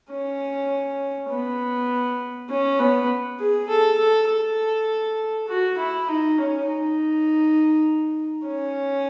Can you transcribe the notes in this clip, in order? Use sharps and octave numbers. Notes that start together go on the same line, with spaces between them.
C#4
B3
C#4
B3
G#4
A4
A4
A4
F#4
E4
D#4
C#4
D#4
C#4